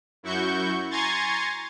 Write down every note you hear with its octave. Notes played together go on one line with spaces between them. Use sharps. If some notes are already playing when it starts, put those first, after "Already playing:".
F#2 E4 F#4 C#6 G6
G#5 A#5 C6 C#6 G#6 A6